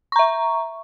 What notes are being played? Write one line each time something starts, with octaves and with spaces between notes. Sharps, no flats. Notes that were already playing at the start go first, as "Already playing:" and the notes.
E5 A#5 C#6